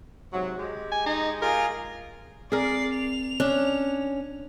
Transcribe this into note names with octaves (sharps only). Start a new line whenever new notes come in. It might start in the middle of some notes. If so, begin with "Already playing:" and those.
G#2 C3 F#3
G#3 G4
G#5
D#4
F4 G#4 A#4 F6
C4 G#4 A#4 D5 C7
F7
C#4 D4